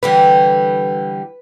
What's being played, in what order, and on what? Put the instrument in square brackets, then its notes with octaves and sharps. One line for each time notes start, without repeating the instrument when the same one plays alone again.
[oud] D3 E3 G3 [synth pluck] B4